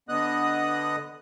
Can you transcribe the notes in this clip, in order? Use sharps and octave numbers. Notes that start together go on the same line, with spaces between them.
D3 B3 D#5 D#6 F#6